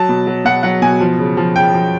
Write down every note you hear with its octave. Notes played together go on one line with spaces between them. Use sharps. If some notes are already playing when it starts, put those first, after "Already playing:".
Already playing: F#3 A5
B2
F#3
B2 F#5
F#3 F#5
B2 G#5
F3
C#3
F3
C#3 G5
F3